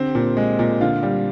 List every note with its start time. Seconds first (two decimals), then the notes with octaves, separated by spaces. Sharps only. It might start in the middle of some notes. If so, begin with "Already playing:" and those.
Already playing: D3 C4 G4
0.15 A#2
0.37 G#3
0.59 A#2
0.81 D3 F4
1.03 G3